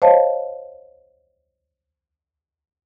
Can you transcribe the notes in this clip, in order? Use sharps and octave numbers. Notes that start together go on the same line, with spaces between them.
C5 C#5 D#5 F5 A5